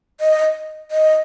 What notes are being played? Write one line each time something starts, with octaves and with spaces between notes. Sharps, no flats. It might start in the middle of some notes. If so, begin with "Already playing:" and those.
D#5
D#5